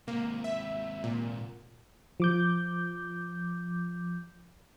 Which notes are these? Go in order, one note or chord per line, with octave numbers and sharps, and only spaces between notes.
G#2 C3 A#3
E5
A#2
F3 D6 G6